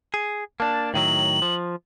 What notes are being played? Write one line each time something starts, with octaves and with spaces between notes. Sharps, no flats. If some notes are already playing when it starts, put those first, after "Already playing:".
G#4
A#3 D4 A5
A2 D#3 F#3 F#7
F3